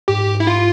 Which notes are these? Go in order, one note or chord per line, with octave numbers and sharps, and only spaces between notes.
G#2 G4
E4
F4